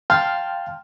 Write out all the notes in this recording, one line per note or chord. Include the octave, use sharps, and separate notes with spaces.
F5 G5 A5 C6 F6